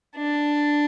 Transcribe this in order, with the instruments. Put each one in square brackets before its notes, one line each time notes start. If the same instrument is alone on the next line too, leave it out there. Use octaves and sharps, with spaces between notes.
[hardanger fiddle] D4